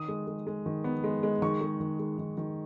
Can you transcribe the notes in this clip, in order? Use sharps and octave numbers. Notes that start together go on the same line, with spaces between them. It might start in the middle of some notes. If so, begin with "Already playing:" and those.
Already playing: D#3 D#6
G#3
G#3
G#3
D#3
B3
G#3
G#3
D#3 C#6
G#3
D#3
G#3
D#3
D#3